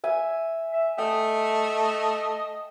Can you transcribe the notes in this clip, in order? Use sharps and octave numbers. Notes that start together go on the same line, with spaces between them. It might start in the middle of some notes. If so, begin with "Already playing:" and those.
E5 G#5
E5
A3 D#5 G5